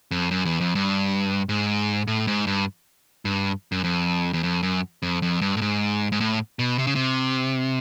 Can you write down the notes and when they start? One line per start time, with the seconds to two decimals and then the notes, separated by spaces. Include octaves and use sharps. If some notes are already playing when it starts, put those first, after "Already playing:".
0.11 F2
0.31 F#2
0.45 E2
0.61 F2
0.75 G2
1.49 G#2
2.07 A2
2.27 G#2
2.47 G2
3.25 G2
3.72 F#2
3.84 F2
4.33 E2
4.43 F2
4.63 F#2
5.02 F2
5.22 F2
5.41 G2
5.57 A2
5.62 G#2
6.12 G#2
6.20 A2
6.59 B2
6.78 C3
6.87 C#3
6.95 C3